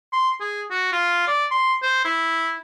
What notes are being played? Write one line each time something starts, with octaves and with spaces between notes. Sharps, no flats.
C6
G#4
F#4
F4
D5
C6
C5
E4